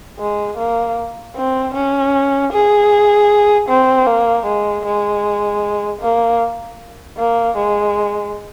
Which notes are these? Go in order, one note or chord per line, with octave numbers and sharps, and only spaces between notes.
G#3
A#3
C4
C#4
G#4
C4
A#3
G#3
G#3
A#3
A#3
G#3